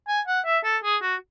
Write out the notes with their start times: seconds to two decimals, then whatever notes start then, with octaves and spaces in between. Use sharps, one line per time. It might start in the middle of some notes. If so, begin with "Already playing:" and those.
0.08 G#5
0.27 F#5
0.46 E5
0.64 A4
0.84 G#4
1.02 F#4